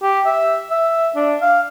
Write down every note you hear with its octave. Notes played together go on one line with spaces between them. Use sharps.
G4
E5
E5
D4
F5